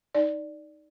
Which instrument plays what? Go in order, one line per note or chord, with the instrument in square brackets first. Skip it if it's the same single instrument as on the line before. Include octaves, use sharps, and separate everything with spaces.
[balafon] D#4 D5